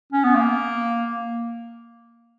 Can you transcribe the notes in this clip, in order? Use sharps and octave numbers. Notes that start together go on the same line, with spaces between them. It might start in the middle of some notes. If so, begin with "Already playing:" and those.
C#4
B3
A#3